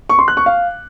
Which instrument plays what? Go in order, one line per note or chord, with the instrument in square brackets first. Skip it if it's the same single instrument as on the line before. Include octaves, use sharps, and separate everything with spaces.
[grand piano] C#6
C6
F#6
C#6
F5